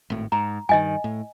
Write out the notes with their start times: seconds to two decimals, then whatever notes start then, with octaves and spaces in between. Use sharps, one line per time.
0.10 G#1 A2
0.32 G#2 A#5
0.69 G2 D#3 D#5 G#5
1.04 A2